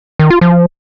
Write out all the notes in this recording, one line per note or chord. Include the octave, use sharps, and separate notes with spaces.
D#3
F4
F3